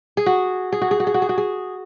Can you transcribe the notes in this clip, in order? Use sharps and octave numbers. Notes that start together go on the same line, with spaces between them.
G#4
F#4
G#4
F#4
G#4
F#4
G#4
F#4
G#4
F#4
G#4